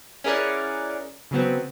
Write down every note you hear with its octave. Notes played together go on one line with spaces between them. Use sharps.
C#4 E4 G#4 A#4 D5 F#5
C#3 F#3 B3 C4